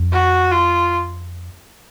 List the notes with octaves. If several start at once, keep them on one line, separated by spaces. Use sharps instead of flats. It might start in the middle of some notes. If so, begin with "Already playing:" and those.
Already playing: F2
F#4
F4